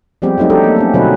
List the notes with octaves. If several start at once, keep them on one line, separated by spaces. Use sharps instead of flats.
F3 G3 G#3 B3 C4 G4
F#3 A3 C4 D#4 G4
D4 G4 A4
A#3
A3 C4 C#4
B2 D3 F#3 C4 D#4 B4